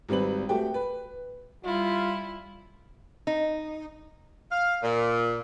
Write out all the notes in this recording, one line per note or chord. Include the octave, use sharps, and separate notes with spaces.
G#1 G3 C4 B4 F#7
A3 F#4 G4 G5
B4
G3 E4 F4
D#4
F5
A#2